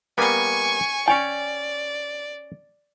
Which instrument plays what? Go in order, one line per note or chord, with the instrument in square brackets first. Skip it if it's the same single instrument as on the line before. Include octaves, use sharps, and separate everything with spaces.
[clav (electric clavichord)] G3 A#3 B3 [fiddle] G#5 C#6
[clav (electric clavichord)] C#4 C#5 G5 [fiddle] D5 [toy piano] G#5